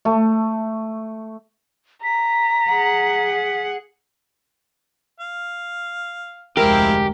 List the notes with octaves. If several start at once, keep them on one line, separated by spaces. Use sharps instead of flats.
A3
A#5 B6
G#4 F#5
F5
F1 D2 G#3 C4 E4 G4 A#4 F5